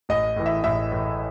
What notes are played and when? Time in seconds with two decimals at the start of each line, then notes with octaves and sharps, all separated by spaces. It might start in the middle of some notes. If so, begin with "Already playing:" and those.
0.09 A1 D#5
0.36 A2 E3
0.46 E5
0.64 A1 E5
0.91 A2 E3